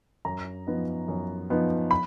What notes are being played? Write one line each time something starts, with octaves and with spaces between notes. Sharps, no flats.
F#2 A#5
F3 B3 D#4
F#2
F3 B3 D#4
B5